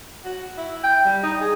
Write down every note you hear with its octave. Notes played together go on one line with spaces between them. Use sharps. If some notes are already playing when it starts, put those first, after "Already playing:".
F#4
E4
G5
G3
D#4
G#4